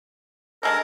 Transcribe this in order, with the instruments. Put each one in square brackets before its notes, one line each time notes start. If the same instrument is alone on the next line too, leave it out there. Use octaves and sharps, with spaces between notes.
[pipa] D3 G#3 A5 [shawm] A#4